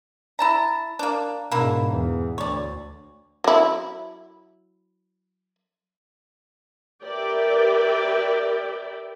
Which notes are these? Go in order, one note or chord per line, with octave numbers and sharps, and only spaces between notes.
E4 A5 A#5
A#3 D4
G#2 B2 A#3 D4 E4
E2
D2 C#5 D5
F#3 E4
G4 A#4 B4 D5 E5 G5